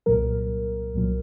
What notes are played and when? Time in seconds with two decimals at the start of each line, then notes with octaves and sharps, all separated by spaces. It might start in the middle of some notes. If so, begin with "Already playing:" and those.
0.06 C2 A#2 F#3 A#4
0.95 C2 A#2 F#3